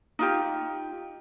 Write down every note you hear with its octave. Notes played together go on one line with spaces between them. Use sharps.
D#4 F4 G4